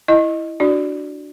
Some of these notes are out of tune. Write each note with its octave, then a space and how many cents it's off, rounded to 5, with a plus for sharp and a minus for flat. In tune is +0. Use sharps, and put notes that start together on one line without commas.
E4 +0 D#5 +0
D4 +5 F#4 +0 D5 +0